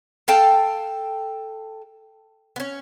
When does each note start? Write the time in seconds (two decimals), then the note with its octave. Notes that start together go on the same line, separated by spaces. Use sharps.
0.28 A4 F5 G5 A5
2.56 B3 C#4